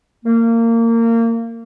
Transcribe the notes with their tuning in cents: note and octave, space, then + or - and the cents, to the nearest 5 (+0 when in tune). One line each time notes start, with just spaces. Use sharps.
A#3 -25